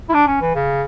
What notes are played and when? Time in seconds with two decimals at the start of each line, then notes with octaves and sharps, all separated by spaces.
0.09 E4
0.14 D4
0.27 C#4
0.41 E3
0.55 C#3